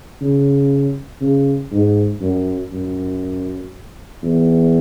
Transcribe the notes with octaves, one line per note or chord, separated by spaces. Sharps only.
C#3
C#3
G#2
F#2
F#2
E2